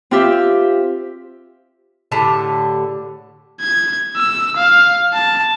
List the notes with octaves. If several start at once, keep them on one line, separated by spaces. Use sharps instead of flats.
C4 F4 G4 E5
A2 D3 G4 A5
G#6
E6
F5
A5